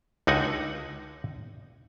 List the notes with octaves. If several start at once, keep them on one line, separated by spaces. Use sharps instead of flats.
C#2 D3 D#4 F#4 F#5 G#5